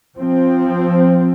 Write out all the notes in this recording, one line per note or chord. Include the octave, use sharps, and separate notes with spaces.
F3 C4